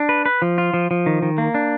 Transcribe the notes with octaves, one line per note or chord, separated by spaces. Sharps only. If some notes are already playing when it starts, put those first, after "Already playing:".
Already playing: D4
B4
B4
F3
F4
F3
F3
D#3
D#3
A#3
D4